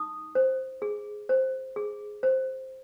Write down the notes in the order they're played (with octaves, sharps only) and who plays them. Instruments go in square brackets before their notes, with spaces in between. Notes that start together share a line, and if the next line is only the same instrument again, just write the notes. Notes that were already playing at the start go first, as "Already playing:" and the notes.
Already playing: [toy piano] D#4 D#6
C5
G#4
C5
G#4
C5